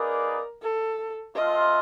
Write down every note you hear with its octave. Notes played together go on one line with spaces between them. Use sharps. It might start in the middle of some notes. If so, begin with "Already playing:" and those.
Already playing: A#3 D#4 G#4 A#4 B4 D5
A4
A3 C4 F4 D#5